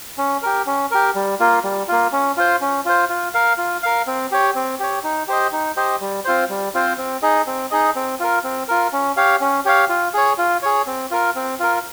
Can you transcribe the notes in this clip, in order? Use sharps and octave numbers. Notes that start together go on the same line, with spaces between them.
C#4
G4 A#4
C#4
G4 A#4
G3
A#3 F4
G3
A#3 F4
C#4
F4 C5
C#4
F4 C5
F4
A#4 F5
F4
A#4 F5
C4
G4 C#5
C4
G4 C#5
D#4
G4 C5 D#5
D#4
G4 C5 D#5
G3
C4 F4 C5
G3
C4 F4 C5
C4
D#4 G#4 D#5
C4
D#4 G#4 D#5
C4
F4 A#4
C4
F4 A#4
C#4
G4 C#5 F5
C#4
G4 C#5 F5
F4
G#4 C#5
F4
G#4 C#5
C4
F4 A#4
C4
F4 A#4